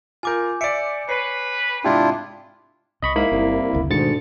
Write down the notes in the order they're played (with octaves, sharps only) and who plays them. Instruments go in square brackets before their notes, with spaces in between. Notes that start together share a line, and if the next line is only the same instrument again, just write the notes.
[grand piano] F4 A#4 [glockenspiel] G#5 D6 G6
[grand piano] D5 E5 [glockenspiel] C#7 D7
[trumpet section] B4 [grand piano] C#5 [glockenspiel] C7
[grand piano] G#2 C3 G4 [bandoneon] D4 E4 F4
[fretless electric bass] C2 C3 [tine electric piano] D#5 B5 C#6
[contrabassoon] G#2 [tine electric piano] A#3 E4 B5
[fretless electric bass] G1 [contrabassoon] C2
[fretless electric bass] F#1 D2 C#3
[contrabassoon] D2 [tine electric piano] G#2 A6 C#7 [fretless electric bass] B2 D3 D#3